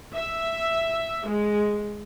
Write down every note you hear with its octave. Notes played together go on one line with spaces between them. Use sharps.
E5
G#3